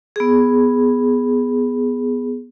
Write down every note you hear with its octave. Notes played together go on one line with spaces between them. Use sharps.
B3 G#4